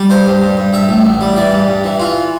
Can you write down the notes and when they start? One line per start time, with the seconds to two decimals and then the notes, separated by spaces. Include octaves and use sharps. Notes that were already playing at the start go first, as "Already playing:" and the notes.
Already playing: G3
0.10 G2 C5
0.26 G2
0.42 G2
0.57 G2
0.73 G2 E5
0.89 A1
1.05 A1
1.21 G3
1.36 E3 D5
1.52 G2
1.68 G2
1.84 E3
2.00 E3 F4